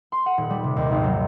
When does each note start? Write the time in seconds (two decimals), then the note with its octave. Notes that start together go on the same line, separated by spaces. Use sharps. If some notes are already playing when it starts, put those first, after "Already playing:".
0.12 C6
0.26 F#5
0.38 D#1
0.50 G3
0.64 C3
0.76 D#2
0.91 G#1
1.04 F#3